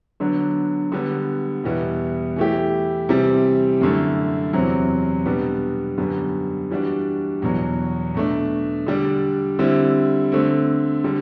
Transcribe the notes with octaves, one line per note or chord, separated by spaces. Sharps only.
D3 F#3 B3 D4
D3 G3 B3
E2 B2 G3 B3 E4
E3 A3 E4 G4
C3 E3 G3 C4
F#2 D3 A3 E4
E2 C3 F#3 C4
B2 G3 B3 D4
F#2 D3 G3 B3
E3 G3 D4 F#4
E2 B2 F#3
B2 A3 D4
D3 G3 D4
D3 G3 C4 E4
D3 A3 C4
D3 G3